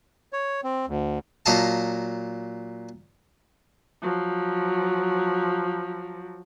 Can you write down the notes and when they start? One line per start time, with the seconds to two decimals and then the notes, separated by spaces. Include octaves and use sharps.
0.33 C#5
0.64 C4
0.87 D2
1.46 A#2 F#3 D#5 F5 A5
4.02 F3 F#3